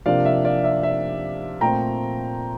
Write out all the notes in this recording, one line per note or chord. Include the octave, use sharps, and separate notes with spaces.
C3 F3 A#3 D4 D5 F5
E5
D5 F5
E5
E5
A#2 A3 C4 G5 A#5